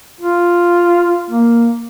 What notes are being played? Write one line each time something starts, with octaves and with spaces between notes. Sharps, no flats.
F4
A#3